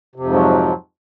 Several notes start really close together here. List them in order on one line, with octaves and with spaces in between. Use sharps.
C3 F2 G#2 F3 F#3